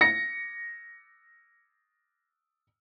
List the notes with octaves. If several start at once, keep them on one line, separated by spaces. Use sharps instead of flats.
A#6 C#7